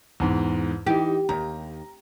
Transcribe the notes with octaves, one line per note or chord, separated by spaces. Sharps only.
E2 G#2
E3 D#4 G4
D#2 A#5